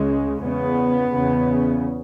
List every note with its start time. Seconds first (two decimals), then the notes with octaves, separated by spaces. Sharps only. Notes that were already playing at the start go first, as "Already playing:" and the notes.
Already playing: C#2 C#3 G#3
0.42 E2 C#3 B3
1.14 E2 C#3